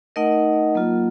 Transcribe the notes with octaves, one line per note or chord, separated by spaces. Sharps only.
A3 D#4 A#4 D#5 F#5
F#3 A#3 F4